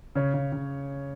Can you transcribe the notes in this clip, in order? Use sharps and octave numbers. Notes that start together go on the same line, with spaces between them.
C#3 C#5
C#3
C#3